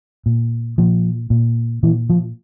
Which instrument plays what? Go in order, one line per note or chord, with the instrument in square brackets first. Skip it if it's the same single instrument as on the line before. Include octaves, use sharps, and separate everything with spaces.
[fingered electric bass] A#2
A#2 F3
A#2
A#2 E3
F3